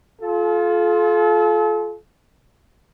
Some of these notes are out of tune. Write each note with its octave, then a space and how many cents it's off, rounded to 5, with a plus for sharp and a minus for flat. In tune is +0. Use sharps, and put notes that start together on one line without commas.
F4 +0 A4 -40